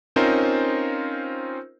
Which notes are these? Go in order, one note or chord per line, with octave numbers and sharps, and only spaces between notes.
C4 C#4 D#4 F4 A#4 C5